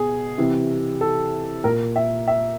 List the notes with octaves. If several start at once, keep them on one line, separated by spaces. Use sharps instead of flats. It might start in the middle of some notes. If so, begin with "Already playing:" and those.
Already playing: B2 G#4
C3 E3
A4
A#2 A#4
E5
E5